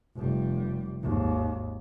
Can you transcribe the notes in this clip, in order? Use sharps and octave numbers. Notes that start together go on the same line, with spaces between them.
F1 G3
G#1 D#2